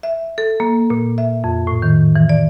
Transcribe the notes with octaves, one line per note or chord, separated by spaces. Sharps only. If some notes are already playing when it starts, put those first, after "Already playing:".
E5
A4
A#3
A#2
E5
F2
A2
D#3
E3
D5